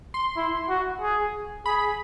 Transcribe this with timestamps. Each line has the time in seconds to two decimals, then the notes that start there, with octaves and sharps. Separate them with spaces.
0.14 C6
0.37 E4
0.69 F#4
1.01 G#4
1.66 G#4 B5